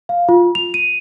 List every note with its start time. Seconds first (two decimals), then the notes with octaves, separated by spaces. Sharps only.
0.09 F5
0.29 F4
0.55 F7
0.74 D#7